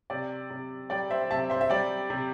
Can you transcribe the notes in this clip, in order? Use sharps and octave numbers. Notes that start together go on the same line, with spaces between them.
C3 D5
C3
G3 D5 G5
C5 E5
C3 E5 A5
C5 E5
E5
G3 D5 G5
C3